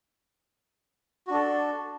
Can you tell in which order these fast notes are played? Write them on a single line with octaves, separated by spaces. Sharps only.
F#4 D4 A4